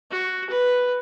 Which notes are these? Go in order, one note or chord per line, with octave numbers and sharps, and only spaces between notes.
F#4
B4